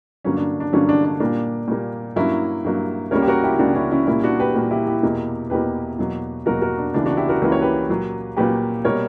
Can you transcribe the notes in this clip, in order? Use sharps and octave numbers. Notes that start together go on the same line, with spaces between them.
G2 D3 F#3 A#3 C#4
D4
D4
G2 D3 F#3 A#3 C#4
D4
D4
A#2 G3 A#3 D4
A#2 G3 A#3
G2 F#3 A#3 C#4 E4
G2 F#3 A#3
C#2 C#3 G3 A#3 A#4 C#5
G4
F#4 A#4
E4 G4
C#2 C#3 G3 A#3 D4 F#4
C#4 E4
C#4 E4
A#2 G3 A#3 C#4 E4
D4 F#4
G4 B4
A#2 G3 A#3
E4 G4
E4 G4
E2 B2 A#3
E2 B2 A#3 G4 B4
E2 B2 F#3 A#3
E2 B2 F#3 A#3 F#4 A#4
F#4 A#4
D4
C#2 C#3 E3 A#3 D4
D4 F#4
E4 G4
F#4 A#4
C#2 C#3 E3 A#3 B4
C#5
G4 B4
A#2 F#3 A#3
A#2 F#3 A#3 G4 B4
B2 G3 A#3 A#4 C#5